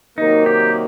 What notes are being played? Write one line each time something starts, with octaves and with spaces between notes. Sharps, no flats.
C3 D#3 F#3 A#3 D#4
G4